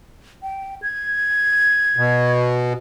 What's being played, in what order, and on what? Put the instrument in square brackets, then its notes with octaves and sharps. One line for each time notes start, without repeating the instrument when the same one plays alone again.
[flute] G5
G#6
[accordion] B2